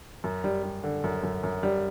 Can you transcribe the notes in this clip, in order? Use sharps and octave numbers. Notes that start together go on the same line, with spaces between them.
F#2
G3
G3
D3
F#2
F#2
F#2
G3